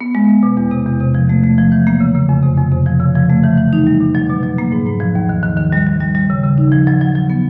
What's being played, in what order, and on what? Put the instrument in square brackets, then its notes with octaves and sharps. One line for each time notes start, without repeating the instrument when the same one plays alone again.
[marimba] B3
G#3
B3
B2
E2
C3
E2
C3
F3
A3
A3
F3
E3
A#3
C#3
C#3
F2
C3
F2
C3
F3
C#3
F3
A3
E3
E3
D#4
G3
B2
F#3
B2
F#3
A#3
G#2
G#2
F3
D#2
D#3
D#3
D#3
G3
G3
G3
G3
C#3
C#3
D#4
F3
F#3
F#3
F#3
B3